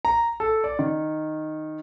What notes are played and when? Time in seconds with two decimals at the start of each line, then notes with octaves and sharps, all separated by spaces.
0.05 A#5
0.40 A4
0.64 D5
0.79 D#3